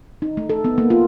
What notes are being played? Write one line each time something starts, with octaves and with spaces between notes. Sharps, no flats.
D#4
A3
A4
B3
A#3
F4